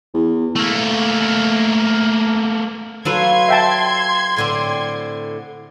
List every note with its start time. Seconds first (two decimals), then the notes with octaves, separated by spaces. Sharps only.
0.14 E2
0.56 A3 A#3
3.05 F#3 F4 A4 B4 C6 G#6
3.49 E5 G5 A5
4.37 A2 D3 C4